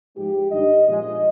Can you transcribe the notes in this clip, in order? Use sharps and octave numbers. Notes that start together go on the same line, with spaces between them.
G#2 F3 G#3 G4
G2 D#3 G3 D#5
A#2 F3 G#3 D#5